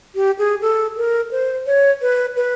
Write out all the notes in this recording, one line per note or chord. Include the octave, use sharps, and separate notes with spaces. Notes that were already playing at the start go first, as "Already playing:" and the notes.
G4
G#4
A4
A#4
C5
C#5
B4
B4